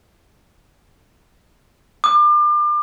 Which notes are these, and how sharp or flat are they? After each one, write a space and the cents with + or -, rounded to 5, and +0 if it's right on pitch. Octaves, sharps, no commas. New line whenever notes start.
D6 +35